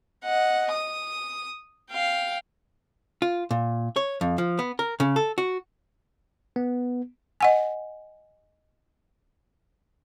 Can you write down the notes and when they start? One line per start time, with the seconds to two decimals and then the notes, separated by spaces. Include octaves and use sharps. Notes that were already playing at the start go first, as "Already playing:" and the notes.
0.24 D#5 F#5
0.72 D#6
1.91 F5 G5
3.22 F4
3.51 A#2
3.96 C#5
4.21 F2
4.38 F3
4.59 B3
4.79 A#4
5.00 C#3
5.16 A4
5.38 F#4
6.56 B3
7.41 D#5 F#5 G#5